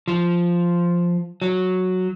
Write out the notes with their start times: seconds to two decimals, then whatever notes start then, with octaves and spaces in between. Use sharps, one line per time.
0.08 F3
1.42 F#3